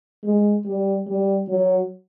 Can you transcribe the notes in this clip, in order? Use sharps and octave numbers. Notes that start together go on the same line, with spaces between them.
G#3
G3
G3
F#3